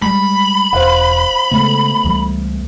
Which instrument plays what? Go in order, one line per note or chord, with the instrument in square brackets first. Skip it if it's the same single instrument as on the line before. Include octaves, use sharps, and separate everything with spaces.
[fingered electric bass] G3 G#3 [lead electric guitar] B5
[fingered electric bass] E1 [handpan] C5 F5 F#5
[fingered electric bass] C#3 G#3 [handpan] A3 B3
[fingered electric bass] C#2 E3 G3